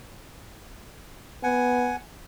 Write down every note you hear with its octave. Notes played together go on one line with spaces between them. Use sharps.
B3 F#5 G#5